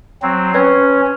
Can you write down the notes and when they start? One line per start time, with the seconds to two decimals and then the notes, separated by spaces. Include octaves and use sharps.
0.22 F#3 C4
0.54 C#4 B4 C#5